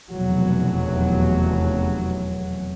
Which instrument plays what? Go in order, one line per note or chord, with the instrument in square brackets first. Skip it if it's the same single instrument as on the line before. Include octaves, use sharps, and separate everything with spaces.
[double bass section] F1 E2 B2 F#3